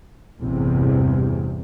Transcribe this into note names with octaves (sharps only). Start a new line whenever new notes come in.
A1 E2 G2 C3